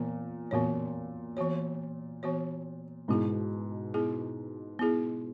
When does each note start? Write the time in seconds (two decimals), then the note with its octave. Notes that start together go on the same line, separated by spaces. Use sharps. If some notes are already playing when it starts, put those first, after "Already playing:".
Already playing: A#2 E3 B3
0.51 A#2 E3 B3 F#4 C#5
1.37 E3 B3 F#4 C#5
2.23 E3 B3 F#4 C#5
3.08 G#2 B2 B3 E4 G#4
3.94 B3 E4 G#4
4.79 B3 E4 G#4